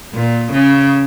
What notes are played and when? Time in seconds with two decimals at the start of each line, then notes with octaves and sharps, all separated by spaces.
0.13 A#2
0.52 C#3